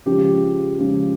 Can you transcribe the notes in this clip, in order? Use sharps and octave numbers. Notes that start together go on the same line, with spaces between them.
C#3 F3 G#3 G4
C#3 F3 G#3